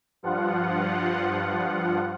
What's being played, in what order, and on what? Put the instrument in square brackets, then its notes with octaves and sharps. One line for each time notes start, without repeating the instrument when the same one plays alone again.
[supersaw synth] G2 F3 F4 F#5